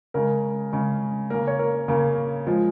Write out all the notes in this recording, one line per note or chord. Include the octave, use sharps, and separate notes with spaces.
C#3 G#3 A#4
C#3 G#3
C#3 A#3 A#4
C#5
A#4
C#3 A#3
F3 G#3